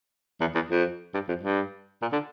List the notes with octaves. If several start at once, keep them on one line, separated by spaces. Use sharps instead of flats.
E2
E2
F2
G2
F2
G2
A#2
D3